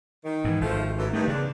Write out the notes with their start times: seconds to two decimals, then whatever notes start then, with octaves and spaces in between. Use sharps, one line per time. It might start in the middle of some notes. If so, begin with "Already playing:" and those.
0.24 D#3
0.45 G#2 E3
0.61 G#1 F3 A3
0.98 F#2 A2 E3
1.13 G2 D#3 A3
1.28 E2 C#3 D4